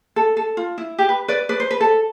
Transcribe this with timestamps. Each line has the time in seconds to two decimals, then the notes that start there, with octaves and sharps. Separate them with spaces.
0.16 A4
0.37 A4
0.57 F4
0.78 E4
0.99 G4
1.09 B4
1.28 B4 D5
1.49 B4 D5
1.60 C5
1.71 B4
1.81 A4